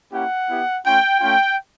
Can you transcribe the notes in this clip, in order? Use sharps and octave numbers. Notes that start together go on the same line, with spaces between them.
A#3 C#4 E4 G4 F#5
B3 E4 G4
A3 C#4 F4 G5
A3 C#4 F4 G5